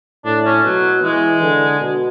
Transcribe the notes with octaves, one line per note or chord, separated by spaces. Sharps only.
A2 D4
C#4
B2 F#3
E3 G#3
D3
B2